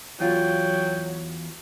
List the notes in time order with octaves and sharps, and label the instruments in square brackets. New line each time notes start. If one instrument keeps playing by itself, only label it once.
[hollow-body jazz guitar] E2 F4 [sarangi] F#3 [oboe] G5